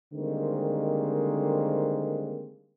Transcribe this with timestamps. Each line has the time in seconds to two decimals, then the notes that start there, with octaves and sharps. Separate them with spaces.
0.13 D3 D#3 G3 G#3 A#3 C4